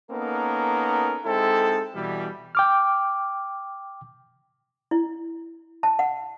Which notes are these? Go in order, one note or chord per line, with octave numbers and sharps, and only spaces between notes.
A#3 B3 C#4 D#4 A4 A#4
G#3 C4 D#4 E4 A4
B2 E3 G3
G5 D6 F6
E4
A5
F#5